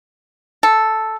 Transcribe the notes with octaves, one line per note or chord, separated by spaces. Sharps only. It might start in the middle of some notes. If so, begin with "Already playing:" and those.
A4